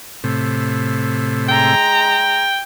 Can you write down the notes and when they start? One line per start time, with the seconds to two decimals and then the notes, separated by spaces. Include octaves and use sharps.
0.24 A2 C3
1.49 G#3 G5 A#5